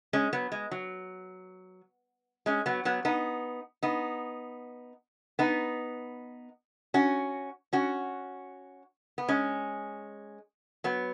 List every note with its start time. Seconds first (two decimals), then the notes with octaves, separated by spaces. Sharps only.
0.13 G#3 C#4
0.33 F#3 B3
0.52 G#3
0.71 F#3
2.46 G#3 C#4
2.66 F#3 B3
2.85 F#3 B3
3.05 B3 D#4
3.83 B3 D#4
5.39 B3 D#4
6.94 C#4 F#4
7.73 C#4 F#4
9.18 B3
9.28 G#3 C#4
10.84 F#3 B3